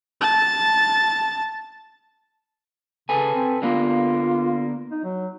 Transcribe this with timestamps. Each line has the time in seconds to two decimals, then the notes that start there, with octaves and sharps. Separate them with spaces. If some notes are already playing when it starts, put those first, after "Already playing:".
0.21 A5 A6
3.09 C#3 A4 B4 G#5
3.34 C4
3.62 D3 A#3 B3 F4
4.92 D#4
5.04 F#3